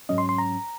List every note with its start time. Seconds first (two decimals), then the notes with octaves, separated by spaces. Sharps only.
0.09 G#2 F#3 C#4 D#5
0.18 C6
0.29 C6
0.38 A#5